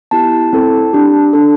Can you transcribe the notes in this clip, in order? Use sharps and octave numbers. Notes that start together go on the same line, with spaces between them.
B3 E4 G4 A5
C4 E4 A4
D4 G4
D4 A4